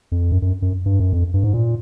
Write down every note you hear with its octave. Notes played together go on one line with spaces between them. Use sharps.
F2
F#2
F#2
F#2
G2
F#2
F2
G2
G#2
A#2